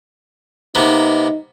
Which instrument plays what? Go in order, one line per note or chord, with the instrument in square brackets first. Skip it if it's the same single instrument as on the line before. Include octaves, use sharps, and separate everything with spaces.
[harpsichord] C3 A#3 B3 [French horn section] D#4